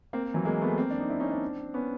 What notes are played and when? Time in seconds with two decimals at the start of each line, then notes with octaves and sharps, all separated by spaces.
0.13 A#3 C4
0.34 E3 F#3
0.45 G#3 A#3
0.62 A3 B3
0.77 A#3 C4
0.90 D4
1.00 D#4
1.10 D4 E4
1.20 C#4 D#4
1.31 C4 D4
1.74 B3 C#4